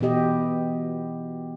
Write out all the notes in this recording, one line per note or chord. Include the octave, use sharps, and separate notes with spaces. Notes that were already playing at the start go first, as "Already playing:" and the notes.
B2 E3 B3 G4 D#5